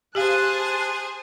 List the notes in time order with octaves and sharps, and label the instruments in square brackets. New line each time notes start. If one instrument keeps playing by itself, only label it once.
[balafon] G4 F5 [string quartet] G#4 C5 [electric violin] A5 F#6